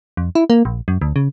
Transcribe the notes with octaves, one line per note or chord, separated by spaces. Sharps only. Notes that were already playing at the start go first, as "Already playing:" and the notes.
F2
E4
A#3
A#1
F#2
D2
C#3